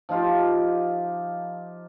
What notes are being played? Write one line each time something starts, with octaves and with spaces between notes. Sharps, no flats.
F3 D#4 F4 G4